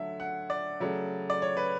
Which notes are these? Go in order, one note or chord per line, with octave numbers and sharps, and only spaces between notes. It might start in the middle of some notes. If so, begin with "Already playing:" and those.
Already playing: D3 F#3 A3 E5
F#5
D5
C#3 F#3 A3
D5
C#5
B4